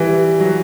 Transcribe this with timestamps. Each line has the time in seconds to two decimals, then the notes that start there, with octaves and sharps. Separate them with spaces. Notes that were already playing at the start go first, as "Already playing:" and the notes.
Already playing: E3 G3
0.40 F#3